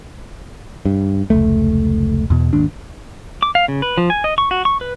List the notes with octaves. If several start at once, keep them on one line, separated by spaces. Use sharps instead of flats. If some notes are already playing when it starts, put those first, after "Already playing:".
G2
F1 C#2 A3
E2 B2
G#1 D#2 D4
D6
F5
C#3
B4
F3
G#5
D#5
C#6
F#4
C#6
B4